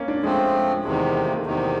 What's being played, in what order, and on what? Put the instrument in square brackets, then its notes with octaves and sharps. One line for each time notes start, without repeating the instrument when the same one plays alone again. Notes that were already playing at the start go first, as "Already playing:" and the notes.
Already playing: [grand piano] A#3 C#4
D4
[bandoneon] F3 A3 C4 [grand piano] G#3
[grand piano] G#3
[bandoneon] E2 C3 D#3 [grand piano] G#3
[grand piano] A3
A#3
A3
[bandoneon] E2 C3 D#3